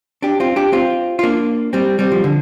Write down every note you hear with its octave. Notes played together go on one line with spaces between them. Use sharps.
D4 G4
C4 F4
D4 G4
C4 F4
F4
A#3 D4
G3 C4
G3 C4
F3
D3